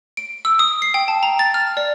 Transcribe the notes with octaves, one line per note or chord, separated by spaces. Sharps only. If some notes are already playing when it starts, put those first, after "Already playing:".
D7
E6
D#6
C7
G5
A5
A#5
A6
F6
D5